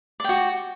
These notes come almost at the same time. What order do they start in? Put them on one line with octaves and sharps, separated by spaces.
D5 G5 F#4